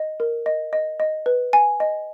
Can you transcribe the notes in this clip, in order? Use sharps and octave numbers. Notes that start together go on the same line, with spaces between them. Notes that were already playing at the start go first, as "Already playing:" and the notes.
Already playing: D#5
A#4
D#5
D#5
D#5
B4
G#5
D#5